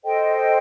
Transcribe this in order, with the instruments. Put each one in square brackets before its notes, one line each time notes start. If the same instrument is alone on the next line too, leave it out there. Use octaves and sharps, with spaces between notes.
[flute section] A4 C5 D#5 G5